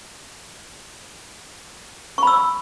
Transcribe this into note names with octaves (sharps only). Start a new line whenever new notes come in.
B5 C#6 E6